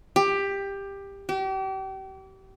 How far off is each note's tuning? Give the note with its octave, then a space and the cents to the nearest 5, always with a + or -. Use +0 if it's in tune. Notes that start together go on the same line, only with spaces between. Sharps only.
G4 +15
G4 -35